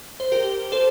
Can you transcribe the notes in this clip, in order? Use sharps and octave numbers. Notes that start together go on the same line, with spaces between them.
C5
G4 A#4
A4 C5